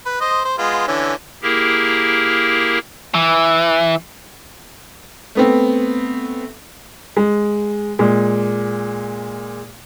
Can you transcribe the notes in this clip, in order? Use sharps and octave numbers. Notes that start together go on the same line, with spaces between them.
B4
C5 D#5
C5
G#3 B3 F4
D3 E3 C#4
A#3 E4 G4 G#4 A#4
E3
A3 B3 C4
G#3
A#2 G#3